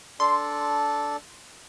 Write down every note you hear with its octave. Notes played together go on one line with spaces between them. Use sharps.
D4 A4 D5 C6